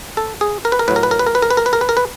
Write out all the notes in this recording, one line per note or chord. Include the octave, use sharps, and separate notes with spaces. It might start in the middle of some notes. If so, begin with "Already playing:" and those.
A4
G#4
A#4
B4
A#4
A2 F#3 B4
A#4
B4
A#4
B4
A#4
B4
A#4
B4
A#4
B4
A#4
B4
A#4
B4